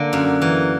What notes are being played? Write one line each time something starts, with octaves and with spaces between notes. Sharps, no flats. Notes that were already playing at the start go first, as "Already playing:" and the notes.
Already playing: D3 A#3
F#2
E3